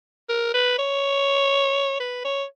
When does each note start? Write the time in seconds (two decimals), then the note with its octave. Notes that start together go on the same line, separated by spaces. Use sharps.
0.30 A#4
0.54 B4
0.79 C#5
2.00 B4
2.25 C#5